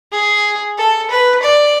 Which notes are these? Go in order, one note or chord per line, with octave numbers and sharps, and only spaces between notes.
G#4
A4
B4
D5